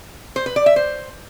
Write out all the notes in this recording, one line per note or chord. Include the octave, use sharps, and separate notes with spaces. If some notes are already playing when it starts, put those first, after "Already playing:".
C5
B4
D5
E5
C5